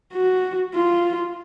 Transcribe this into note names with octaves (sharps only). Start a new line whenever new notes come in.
F#4
F4